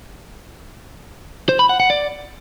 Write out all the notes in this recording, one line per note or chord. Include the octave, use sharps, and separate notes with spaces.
C5
B5
F#5
F#5
D5